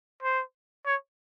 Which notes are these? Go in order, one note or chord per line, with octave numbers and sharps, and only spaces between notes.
C5
C#5